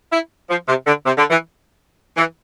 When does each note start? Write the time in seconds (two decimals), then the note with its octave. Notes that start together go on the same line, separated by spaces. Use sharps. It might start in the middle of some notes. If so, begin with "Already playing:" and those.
0.13 E4
0.50 F3
0.68 C3
0.87 D3
1.06 C3
1.18 D3
1.30 E3
2.17 E3